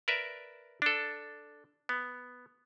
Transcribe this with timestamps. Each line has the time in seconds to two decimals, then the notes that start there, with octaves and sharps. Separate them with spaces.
0.08 A#4 B4 D5 E5
0.82 D4 A4
1.89 B3